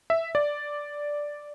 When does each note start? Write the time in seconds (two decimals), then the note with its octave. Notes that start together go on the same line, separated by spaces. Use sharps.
0.10 E5
0.35 D5